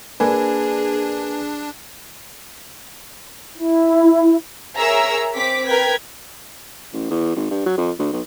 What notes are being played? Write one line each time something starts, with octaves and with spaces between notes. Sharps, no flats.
A#3 D4 G#4 A#4 B4 D5 G#5
E4
G#4 A#4 C#5 E5 A#5 E6
C4 D6 B6
A#4 B4 G5 G#6 B6
A1
E2
G#1
G2
F#3
F2
D2
B1